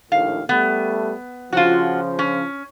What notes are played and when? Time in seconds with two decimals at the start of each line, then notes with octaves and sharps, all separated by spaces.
0.12 A#1 D#2 A2 F5
0.49 G3 A3 B3
1.53 C#3 F3 F4 F#4
2.19 C#4